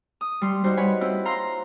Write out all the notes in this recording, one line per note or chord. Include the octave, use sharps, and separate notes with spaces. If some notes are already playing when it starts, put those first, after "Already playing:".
D#6
G3 C6
G3 D#4 F#4 C5
B4 C#5 F#5 G#5
C4 E4 F4
F5 A#5 C6